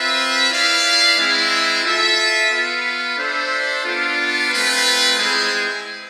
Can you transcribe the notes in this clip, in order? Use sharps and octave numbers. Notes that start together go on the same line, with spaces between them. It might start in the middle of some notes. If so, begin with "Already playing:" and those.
Already playing: C4 F4 B4 E5
E4 B4 D5 F5
G#3 C4 E4
F4 A4 E5
B3 F4 B4
D4 A4 C5 E5
B3 D4 F4
A3 C4 F4 B4
G#3 C4 E4 G#4 C5